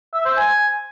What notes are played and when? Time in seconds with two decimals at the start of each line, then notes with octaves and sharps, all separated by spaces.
0.13 E5
0.25 C5
0.37 G#5